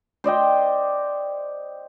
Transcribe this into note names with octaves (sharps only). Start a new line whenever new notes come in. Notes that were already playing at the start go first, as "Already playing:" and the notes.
C5 D5 D#5 G5